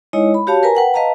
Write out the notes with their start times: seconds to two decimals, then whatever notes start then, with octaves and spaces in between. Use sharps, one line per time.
0.13 G#3 D#4 E4 C#5 D#5
0.34 B5
0.47 F#4 G4 C#5 F5 A5
0.63 A#4 B4 G#5 A#5
0.75 B4 F#5 G5
0.94 B4 D#5 F5 A5 A#5